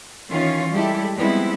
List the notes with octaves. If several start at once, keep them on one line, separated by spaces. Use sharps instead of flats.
D#3 E3 C#4 F4 C#5
G3 G#3 E4 G4 A4
F3 G3 G#3 B3 C4 E4